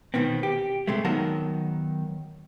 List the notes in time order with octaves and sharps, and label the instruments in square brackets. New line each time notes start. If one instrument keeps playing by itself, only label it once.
[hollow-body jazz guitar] B2 D#3 B3 C4
G4
C3 G#3 A3
D#3 F#3 B3 A#4 A5